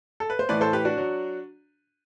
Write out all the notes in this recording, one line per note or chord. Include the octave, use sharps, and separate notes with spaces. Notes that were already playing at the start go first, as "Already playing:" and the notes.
A4
B4
C5
A2 E3 B4 D5
A4 C5
G4 B4
D4 F#4
F#3